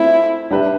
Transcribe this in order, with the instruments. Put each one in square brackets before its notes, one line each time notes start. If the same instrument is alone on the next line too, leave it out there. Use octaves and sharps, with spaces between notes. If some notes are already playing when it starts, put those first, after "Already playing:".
Already playing: [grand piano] A3 C4 F4 C5 [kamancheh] E4
[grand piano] G3 D4 G4 B4 E5